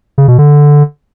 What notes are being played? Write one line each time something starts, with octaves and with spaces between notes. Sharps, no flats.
C#3
B2
D3